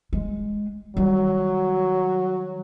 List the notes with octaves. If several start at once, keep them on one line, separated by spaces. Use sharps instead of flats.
G#3
D#3 F#3 G3